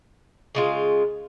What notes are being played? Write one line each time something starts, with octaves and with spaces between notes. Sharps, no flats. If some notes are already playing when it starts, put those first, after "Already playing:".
C#3 G#3 F4